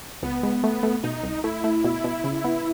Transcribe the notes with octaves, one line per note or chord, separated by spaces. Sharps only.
C#2 B3
G#3
A3
A3
B2 D#4
C2
A3 E4
A3
B2
B2
C#3
B3